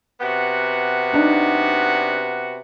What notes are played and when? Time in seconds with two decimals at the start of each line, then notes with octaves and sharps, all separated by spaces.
0.21 C3 B3 F#4
1.13 D4 D#4